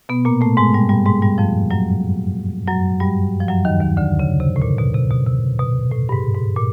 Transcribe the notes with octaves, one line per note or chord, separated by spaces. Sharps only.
B2 B3
A#2 A#3
A2 A3
G#2 G#3
G2 G3
G2 G3
G#2 G#3
G2 G3
F2 F3
F#2 F#3
F#2 F#3
G2 G3
F3
F#2 F#3
D#2 D#3
D#2 D#3
D2 D3
C#3
C3
A2
A#2
B2
C3
B2
C3
B2
A2
G2
G#2
G#2
A#2